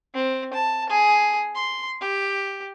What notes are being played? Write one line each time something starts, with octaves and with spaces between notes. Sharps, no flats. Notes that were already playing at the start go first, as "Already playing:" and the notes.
C4
A5
G#4
C6
G4